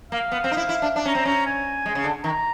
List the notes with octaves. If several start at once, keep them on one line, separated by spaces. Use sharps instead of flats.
A#3 F5
B3
C4
D#4
E4
E4
D4
D4
C#4 A#5
C4
C#4 A#5
G#5
G#3
C#3
D3
D#3 A#5